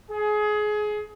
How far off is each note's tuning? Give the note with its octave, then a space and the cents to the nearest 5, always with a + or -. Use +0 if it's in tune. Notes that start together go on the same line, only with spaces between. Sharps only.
G#4 +25